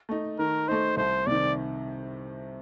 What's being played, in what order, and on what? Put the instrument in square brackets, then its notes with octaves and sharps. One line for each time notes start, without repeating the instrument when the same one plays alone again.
[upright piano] A3 D#4
[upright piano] D#3 [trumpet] A#4
[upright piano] A3 D#4 [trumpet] C5
[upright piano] C2 [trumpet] C5
[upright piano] C3 D#3 [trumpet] D5